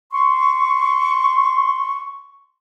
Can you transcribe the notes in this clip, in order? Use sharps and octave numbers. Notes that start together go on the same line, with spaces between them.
C6 C#6